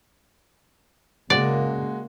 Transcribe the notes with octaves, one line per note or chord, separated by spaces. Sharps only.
C#3 G#3 A#3 F#4 D5